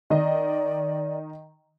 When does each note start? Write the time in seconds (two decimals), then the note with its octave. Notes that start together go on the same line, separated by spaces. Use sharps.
0.10 D#3 D5 D#5